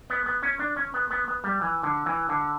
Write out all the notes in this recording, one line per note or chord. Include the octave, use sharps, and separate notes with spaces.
B3
B3
C#4
D4
C#4
B3
B3
B3
G3
E3
D3
E3
D3